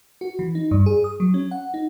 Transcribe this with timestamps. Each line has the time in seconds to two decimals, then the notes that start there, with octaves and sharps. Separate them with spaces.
0.21 F#4
0.39 E3
0.55 D#4
0.71 G2
0.86 G#4
1.04 D#6
1.20 F#3
1.34 C#4
1.51 F#5
1.74 D#4